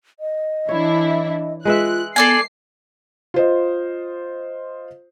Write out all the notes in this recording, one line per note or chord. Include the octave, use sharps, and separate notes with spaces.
D#5
E3 D4 E4 C#5
G#3 F4 B4 E5 F#6
B3 A4 D5 G#5 C7
F4 C5 D#5